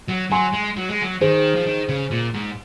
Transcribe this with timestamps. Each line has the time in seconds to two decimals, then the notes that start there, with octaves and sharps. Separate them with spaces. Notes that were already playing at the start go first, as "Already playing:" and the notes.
0.09 F#3
0.32 F#3 G#5 C6
0.54 G#3
0.77 F#3
0.89 G#3
1.02 F#3
1.21 D#3 G#4 C5
1.55 F3
1.66 D#3
1.89 C#3
2.11 A#2
2.34 G#2